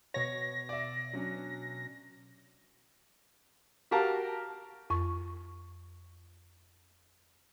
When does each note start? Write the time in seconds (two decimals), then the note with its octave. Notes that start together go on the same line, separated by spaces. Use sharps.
0.14 B2 C#5 A#6
0.69 D5 E5
1.13 F#3 C#4 D4
3.91 F#4 G4 A#4 F5 A5 A#5
4.90 F2 C#6